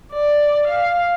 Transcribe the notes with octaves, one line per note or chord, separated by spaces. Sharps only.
D5
F5